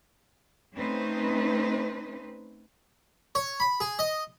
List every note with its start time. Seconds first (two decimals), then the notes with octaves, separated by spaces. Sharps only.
0.75 A3 C4 C#4 D#4 B4 C5
3.35 C#5
3.60 B5
3.80 G#4
3.99 D#5